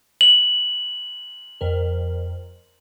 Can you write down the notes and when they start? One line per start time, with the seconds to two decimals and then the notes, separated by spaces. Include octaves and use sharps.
0.21 F#7
1.61 F2 A#4